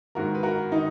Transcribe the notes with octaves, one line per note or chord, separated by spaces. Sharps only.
G#2 D#3 F#4 A#4
B4
F#4 A#4
D#3 D#4